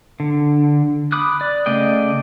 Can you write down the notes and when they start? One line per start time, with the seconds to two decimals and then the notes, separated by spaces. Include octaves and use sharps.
0.20 D3
1.12 B5 D6 D#6 F#6
1.41 D5
1.66 C#3 A3 D5 D#5 G5